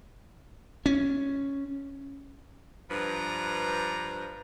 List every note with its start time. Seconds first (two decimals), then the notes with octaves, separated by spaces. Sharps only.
0.86 C#4
2.91 G2 F3 B4 A#5